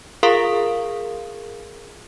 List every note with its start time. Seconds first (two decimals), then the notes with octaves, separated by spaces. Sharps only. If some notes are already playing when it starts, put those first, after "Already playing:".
0.23 F4 G#4 A#4 F5 C6 D#6